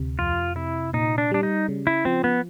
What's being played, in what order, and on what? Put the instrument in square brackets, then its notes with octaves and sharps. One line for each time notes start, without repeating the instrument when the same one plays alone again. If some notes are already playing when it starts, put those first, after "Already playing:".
Already playing: [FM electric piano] D2 C3
[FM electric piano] F2 [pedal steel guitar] F4
[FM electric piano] C3 [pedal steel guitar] E4
[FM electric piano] A#2 [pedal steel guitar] D#4
[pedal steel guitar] D4
[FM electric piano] G3 [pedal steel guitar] D4
[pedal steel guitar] D#4
[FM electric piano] C#3
[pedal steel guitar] E4
[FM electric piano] F3 [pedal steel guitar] C4
[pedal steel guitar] B3